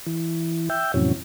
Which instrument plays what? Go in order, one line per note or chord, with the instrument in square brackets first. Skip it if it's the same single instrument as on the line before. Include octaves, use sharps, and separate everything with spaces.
[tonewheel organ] E3
E5 G5
F2 A2 C3 E3 F#3 C#4